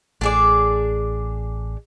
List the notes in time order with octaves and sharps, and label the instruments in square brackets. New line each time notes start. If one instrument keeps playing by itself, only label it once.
[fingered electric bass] A1 [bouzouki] D4 G#4 D5